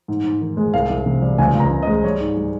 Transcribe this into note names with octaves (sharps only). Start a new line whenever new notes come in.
G#2
G#2
D#3
G#3
C2 F5
C2
C3
G3
C#2 G#5
C#2 A#5
C#3
D#5
G#3
G3 C#5
G#2
G3